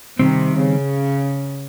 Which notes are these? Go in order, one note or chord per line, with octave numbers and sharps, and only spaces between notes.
C3 D#3 G3 C4
C#3